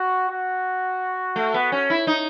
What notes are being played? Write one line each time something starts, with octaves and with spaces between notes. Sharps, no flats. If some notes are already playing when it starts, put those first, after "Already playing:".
Already playing: F#4
F#4
A3
B3
C#4
E4
D#4